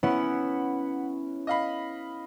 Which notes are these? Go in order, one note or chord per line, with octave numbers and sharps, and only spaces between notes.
B3 C#4 E4 F#5 B5
D#5 F5 B5